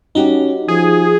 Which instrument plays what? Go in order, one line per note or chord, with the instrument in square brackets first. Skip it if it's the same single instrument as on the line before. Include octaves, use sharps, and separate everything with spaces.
[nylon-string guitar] G3 F#4 G4 [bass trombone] C#4 [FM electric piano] D#4
[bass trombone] F3 [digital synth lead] G#4